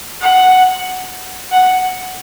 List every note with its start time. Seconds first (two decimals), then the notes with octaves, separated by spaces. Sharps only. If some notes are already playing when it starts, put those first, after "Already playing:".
0.21 F#5
1.52 F#5